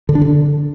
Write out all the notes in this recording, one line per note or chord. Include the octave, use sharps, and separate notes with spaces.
D3
D4
D3